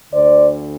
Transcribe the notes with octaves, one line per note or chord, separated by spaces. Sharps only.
D2 D3 C5 D5